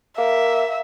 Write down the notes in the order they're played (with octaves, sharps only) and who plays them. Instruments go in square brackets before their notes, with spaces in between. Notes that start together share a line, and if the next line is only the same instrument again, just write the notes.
[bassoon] A#3 [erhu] E5